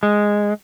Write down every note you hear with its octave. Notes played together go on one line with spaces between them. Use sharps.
G#3